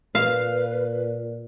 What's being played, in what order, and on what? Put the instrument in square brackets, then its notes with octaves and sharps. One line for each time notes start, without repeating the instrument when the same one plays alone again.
[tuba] A#2 [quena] B4 [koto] F5